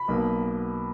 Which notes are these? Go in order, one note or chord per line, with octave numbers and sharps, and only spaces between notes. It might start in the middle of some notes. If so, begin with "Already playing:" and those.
Already playing: B5
B1 B2 A#3